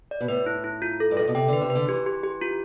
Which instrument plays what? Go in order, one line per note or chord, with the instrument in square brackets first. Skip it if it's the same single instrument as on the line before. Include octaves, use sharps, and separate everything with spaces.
[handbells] D5
[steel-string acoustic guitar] B2
[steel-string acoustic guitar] A2 [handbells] B4
[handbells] E4
E4
F4
A4
[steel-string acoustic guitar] G2
[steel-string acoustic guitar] A2 [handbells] A4
[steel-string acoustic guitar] B2
[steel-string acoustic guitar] C3 [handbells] G5
[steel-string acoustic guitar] D3 [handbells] B4
[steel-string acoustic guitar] C3
[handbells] B4
[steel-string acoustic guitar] D3
[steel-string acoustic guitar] E3 [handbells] G4
[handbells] G4
G4
F4